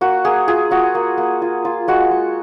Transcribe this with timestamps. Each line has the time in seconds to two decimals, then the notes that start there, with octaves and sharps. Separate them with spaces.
0.01 A#3 F#4
0.25 A#3 G#4
0.48 F4 G#4
0.71 F4 F#4
0.95 A#3
1.18 A#3
1.42 F4
1.65 F4
1.88 G#3 F#4
2.11 G#3